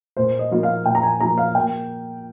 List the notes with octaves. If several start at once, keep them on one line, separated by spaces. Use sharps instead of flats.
A#2 C5
D#5
F3 A#3 F4
F5
A#2 G5
A#5
G#5
F3 A#3 F4 A#5
F5
A#3 G5